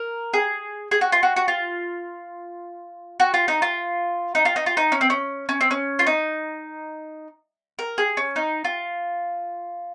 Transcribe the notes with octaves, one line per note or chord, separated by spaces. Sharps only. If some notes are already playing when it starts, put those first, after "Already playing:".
Already playing: A#4
G#4
G#4
F#4
F4
F#4
F#4
F4
F#4
F4
D#4
F4
D#4
F4
D#4
F4
D#4
C#4
C4
C#4
C#4
C4
C#4
F4
D#4
A#4
G#4
C#4
D#4
F4